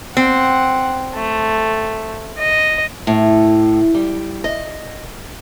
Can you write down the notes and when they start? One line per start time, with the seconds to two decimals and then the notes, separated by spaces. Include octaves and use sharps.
0.17 C4 F#5
1.15 A3
2.38 D#5
3.07 A2
3.95 G3
4.44 D#5